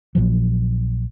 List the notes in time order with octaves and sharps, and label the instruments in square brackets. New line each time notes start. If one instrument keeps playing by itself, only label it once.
[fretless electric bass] A#1 A#2 F3 F#3